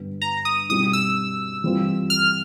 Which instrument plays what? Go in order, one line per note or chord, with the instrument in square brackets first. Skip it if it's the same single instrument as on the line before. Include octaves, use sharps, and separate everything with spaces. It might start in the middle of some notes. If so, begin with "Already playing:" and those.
Already playing: [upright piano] G2 D3 G3 B3
[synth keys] A#5
D#6
[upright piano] B2 G3 C4 D#4 [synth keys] D#6
[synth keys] E6
[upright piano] E3 G3 C4 F4
[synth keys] F6